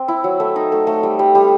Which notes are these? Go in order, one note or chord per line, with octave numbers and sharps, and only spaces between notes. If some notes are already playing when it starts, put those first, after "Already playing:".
Already playing: C4
E4
F#3
A3 E5
D#4
A3
A3
G3
G3
G3